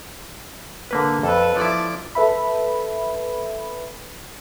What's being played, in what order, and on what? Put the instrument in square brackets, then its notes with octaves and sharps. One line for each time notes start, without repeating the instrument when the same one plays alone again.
[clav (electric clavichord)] D3 A#3 B4
[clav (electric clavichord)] F2 [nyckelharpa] A4 B4
[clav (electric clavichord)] F3 E4 [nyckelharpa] D5
[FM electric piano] A4 B4 E5 B5